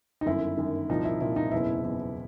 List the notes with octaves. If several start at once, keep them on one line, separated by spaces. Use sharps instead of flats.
D#4
G1 F#2 D#3 E4
G1 F#2 D#3
C2 A#2 F3 D#4
E4
C2 A#2 F3 E4
D#4
F#1 E2 B2 E4
F#1 E2 B2